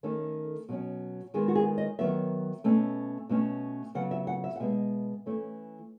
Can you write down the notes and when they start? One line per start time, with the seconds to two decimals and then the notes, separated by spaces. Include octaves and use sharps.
0.03 D#3 A3 C#4 A4
0.69 B2 F#3 C#4
1.34 D#3 G#3 B3 G#4
1.48 F#4
1.55 G#4
1.78 D#5
1.99 D#3 F#3 B3 E5
2.64 B2 A3 C#4
3.29 B2 A3 C#4
3.95 C#3 F#3 B3 F#5
4.11 E5
4.27 F#5
4.44 E5
4.56 F#5
4.60 B2 G#3 B3 E5
5.26 E3 A3 C#4